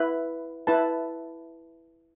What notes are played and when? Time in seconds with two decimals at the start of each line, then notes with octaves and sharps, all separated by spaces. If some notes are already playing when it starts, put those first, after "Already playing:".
Already playing: E4 B4
0.67 E4 B4 A5